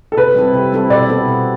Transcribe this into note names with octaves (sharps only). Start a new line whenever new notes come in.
A4
C3 B4
G3 C4 E4 A4
C3
G3 C4 E4 A4
B2 D5
B3 E4 A4
B2